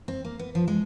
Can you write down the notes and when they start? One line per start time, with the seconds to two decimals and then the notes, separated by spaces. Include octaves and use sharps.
0.08 C4
0.25 A#3
0.39 B3
0.55 F3
0.68 G#3